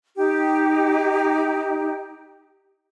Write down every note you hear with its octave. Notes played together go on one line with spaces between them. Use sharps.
D#4 G4